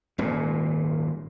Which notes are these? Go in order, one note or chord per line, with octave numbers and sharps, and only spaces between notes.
D#1 G#1 A#2